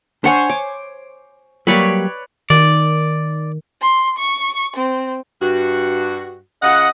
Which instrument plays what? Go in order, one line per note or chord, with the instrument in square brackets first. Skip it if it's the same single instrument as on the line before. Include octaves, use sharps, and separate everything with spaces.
[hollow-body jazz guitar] D4 F#5 [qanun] C5 C#5 G#5
[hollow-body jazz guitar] C#5 [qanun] D6
[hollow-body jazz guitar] F#3 G3 A#3 [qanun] B4 C#5 D5
[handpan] D#3 [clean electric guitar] D5
[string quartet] C6
C#6
C4
[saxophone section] G2 F#4
[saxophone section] C#3 F4 F#5 [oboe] D#5